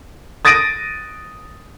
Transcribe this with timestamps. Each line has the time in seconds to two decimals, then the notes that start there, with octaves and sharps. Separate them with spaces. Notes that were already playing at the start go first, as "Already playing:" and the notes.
0.45 D#6 A6 A#6 D7 D#7